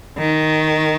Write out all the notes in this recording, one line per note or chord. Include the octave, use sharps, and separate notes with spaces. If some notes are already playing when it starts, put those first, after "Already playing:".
D#3